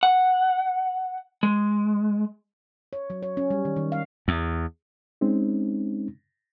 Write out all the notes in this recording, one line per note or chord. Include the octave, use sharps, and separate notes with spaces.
F#5
G#3
C#5
F#3
C#5
C#4
G3
D#3
D#3
F5
E2
G#3 C4 C#4 D#4